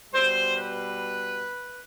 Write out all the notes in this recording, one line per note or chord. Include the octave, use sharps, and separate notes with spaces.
B2 G3 C5
B4